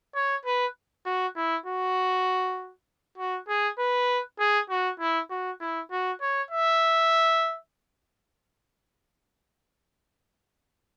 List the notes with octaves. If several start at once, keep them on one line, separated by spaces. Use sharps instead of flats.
C#5
B4
F#4
E4
F#4
F#4
G#4
B4
G#4
F#4
E4
F#4
E4
F#4
C#5
E5